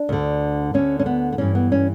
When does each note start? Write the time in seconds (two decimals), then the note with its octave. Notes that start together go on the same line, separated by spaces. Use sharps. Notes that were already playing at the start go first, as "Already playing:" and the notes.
Already playing: D4
0.09 D2 D3
0.74 D2 D3 C#4
0.99 C#4
1.06 B3
1.32 B3
1.38 G2 E3 C#4
1.55 B3
1.72 C#4